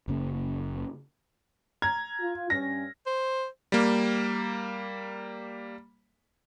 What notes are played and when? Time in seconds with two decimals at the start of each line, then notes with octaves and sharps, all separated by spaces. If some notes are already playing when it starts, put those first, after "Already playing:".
0.08 F#1 C#3 A#3
1.82 A#5 G#6
2.20 F4
2.50 G2 C#4 A#6
3.06 C5
3.72 G3 A#3